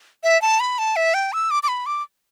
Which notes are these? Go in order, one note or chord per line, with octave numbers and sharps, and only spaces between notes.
E5
A5
B5
A5
E5
G5
E6
D6
D6
B5
D6